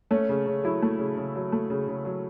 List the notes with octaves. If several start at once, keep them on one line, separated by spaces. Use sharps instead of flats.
A3 C#4
C#3
C#3
F#3 E4
A3
C#3
C#3
F#3
A3
C#3
C#3
F#3